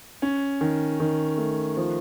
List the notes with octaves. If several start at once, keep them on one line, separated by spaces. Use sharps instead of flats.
C#4
D#3
D#3
A3
F3